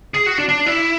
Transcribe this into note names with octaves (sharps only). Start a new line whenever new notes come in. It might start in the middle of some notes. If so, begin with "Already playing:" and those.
G#4
F#4
D4
D4
E4